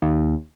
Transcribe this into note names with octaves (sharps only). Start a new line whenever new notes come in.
D#2